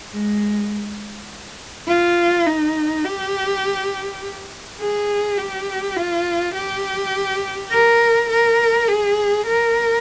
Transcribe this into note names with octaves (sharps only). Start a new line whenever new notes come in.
G#3
F4
D#4
G4
G#4
G4
F4
G4
A#4
A#4
G#4
A#4